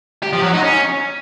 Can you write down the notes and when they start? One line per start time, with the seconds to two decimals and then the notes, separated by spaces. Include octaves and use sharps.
0.22 G4
0.33 F3
0.43 F#3
0.53 D#4
0.64 C#4